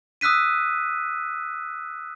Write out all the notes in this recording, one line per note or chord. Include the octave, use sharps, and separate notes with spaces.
D#6 E6 F#6 B6 D#7